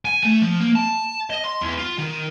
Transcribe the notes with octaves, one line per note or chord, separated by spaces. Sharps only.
G#5
A3
F3
A#3
A5
D#5
C6
E2
F4
D#3